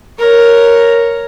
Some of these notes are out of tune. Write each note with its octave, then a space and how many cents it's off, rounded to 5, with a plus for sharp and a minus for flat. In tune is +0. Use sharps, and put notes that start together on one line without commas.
A#4 +0 C#5 +0